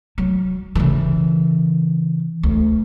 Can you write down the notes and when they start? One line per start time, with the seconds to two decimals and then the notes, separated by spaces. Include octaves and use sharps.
0.18 F#3
0.75 C#3 E3
2.43 D2